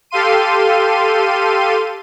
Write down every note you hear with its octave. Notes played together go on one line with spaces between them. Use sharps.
G4 A4 F5 C6 D#7